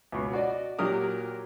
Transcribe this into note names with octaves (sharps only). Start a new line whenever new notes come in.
C#2 B2
F#4 D5 D#5
A#2 F#3 G4 A#4 D#6